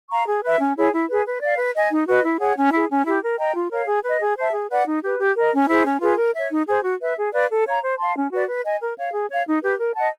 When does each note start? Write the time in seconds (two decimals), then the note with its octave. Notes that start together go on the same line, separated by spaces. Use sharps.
0.10 F5 A#5 C#6
0.27 G#4
0.42 B4 E5
0.60 C#4
0.77 E4 G#4 C#5
0.92 E4
1.08 G#4 B4
1.26 B4
1.42 D5 F5
1.58 B4
1.74 D#5 G#5
1.91 D#4
2.07 F#4 B4 D#5
2.23 E4
2.40 G#4 C#5 F#5
2.57 C#4
2.73 E4 G#4
2.89 C#4
3.06 E4 G4
3.22 A#4
3.38 D#5 G5 A#5
3.55 F4
3.71 A#4 C#5 F5
3.88 G#4
4.04 B4 D#5
4.21 G#4
4.37 C5 E5 A5
4.53 G#4
4.70 B4 D5 F#5
4.86 D#4
5.03 G4 B4
5.19 G4
5.36 A#4 D#5
5.52 C#4
5.69 E4 G#4 C5
5.86 C#4
6.01 F4 G#4 B4
6.18 A#4
6.34 C#5 E5
6.51 D#4
6.67 G#4 C5
6.83 F#4
7.00 B4 E5
7.17 G#4
7.33 B4 D5 F5
7.49 A4
7.66 C#5 F5 A#5
7.82 C5
7.99 F5 A5 C6
8.15 C#4
8.31 F#4 B4 D5
8.48 B4
8.64 D#5 G#5
8.81 A#4
8.97 C#5 F5
9.13 G#4
9.30 C#5 F5
9.47 D#4
9.62 G4 B4
9.79 A#4
9.96 D#5 F#5 A5